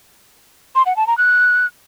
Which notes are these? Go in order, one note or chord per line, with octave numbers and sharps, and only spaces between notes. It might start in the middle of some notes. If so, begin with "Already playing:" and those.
C6
F#5
A5
A#5
F#6